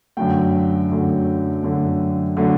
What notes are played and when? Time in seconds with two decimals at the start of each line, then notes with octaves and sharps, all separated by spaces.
0.17 F#2 D3 F#3 A3 G5
0.90 F#2 D3 F#3 A3
1.63 F#2 D3 F#3 A3
2.37 D3 F#3 A3